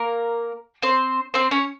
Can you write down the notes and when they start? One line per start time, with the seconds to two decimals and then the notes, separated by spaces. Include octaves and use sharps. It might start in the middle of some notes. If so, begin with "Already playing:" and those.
Already playing: A#3 A#4
0.82 C4 C5
1.34 C4 C5
1.51 C#4 C#5